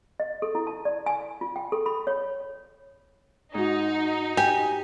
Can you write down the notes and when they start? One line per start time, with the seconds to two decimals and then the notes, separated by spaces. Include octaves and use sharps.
0.20 D#5
0.42 A4
0.55 E4
0.67 A5
0.85 D5
1.06 G#5
1.41 F4
1.56 G5
1.72 A4
1.86 B5
2.07 C#5
3.54 G#2 D#4 F#4
4.37 G4 G#5